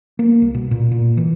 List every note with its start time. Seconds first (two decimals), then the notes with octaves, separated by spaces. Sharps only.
0.19 A#3
0.42 C2
0.54 B2
0.71 A#2
0.91 A#2
1.17 E3